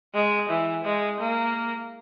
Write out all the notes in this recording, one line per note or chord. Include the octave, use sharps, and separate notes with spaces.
G#3
E3
G#3
A#3